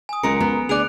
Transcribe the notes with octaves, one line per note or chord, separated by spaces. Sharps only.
G#5 D#6
C#2 F#3 G#3 A#4 C#7 D7
B3
D2 G#4 D5 F#6 D7 F7